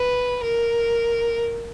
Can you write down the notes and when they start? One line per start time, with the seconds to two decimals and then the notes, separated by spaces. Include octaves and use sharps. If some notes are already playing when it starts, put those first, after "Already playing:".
Already playing: B4
0.44 A#4